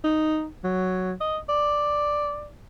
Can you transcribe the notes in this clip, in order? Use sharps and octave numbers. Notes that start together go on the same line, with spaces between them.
D#4
F#3
D#5
D5